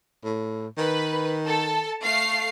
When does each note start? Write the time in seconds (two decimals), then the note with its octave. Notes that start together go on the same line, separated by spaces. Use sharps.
0.24 A2
0.78 D#3 B4
1.45 A4 A5
2.02 A3 F5 C7